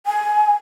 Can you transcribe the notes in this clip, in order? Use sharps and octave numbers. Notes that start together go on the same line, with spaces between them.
G#5